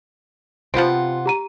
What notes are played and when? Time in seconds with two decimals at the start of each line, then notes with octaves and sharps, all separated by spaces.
0.74 C3 F3 B3 C4 F4 F#5 D7
1.26 G4 A#5 D#7